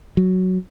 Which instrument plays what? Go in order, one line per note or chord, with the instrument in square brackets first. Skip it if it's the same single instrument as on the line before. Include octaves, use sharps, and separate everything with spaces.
[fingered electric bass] F#3